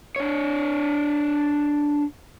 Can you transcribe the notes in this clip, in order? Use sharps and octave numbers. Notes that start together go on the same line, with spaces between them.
D4 C#5